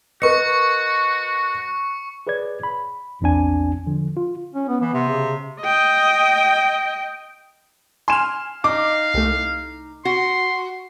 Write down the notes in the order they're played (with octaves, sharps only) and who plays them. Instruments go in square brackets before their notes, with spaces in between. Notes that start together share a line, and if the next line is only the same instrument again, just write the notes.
[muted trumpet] F#4 [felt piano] A#4 B4 D#5 [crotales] C#6 C#7
[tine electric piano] G#4 B4 C#5 D5 G#6
B5
A#1 E2 C4 D4 G#5
D3 F3
F4
[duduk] C#4
B3
[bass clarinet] E3 [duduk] B3
[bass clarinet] C3
[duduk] C#3
[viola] D#5 G5
[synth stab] G#5 F6 [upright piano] C6 E7
[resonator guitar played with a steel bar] D#4 [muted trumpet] F5 [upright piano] D6
[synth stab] C2 A3
[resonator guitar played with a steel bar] F#4 [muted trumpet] C6